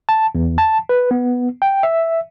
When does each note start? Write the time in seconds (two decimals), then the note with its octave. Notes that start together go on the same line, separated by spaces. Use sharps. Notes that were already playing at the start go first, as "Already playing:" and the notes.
0.09 A5
0.35 E2
0.58 A5
0.89 B4
1.11 B3
1.62 G5
1.83 E5